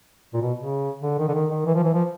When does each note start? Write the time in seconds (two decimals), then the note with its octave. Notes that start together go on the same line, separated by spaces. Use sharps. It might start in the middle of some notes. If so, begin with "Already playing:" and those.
0.34 A#2
0.42 B2
0.58 C#3
1.03 D3
1.19 D#3
1.28 D3
1.34 D#3
1.51 D#3
1.66 E3
1.75 F3
1.84 E3
1.94 F3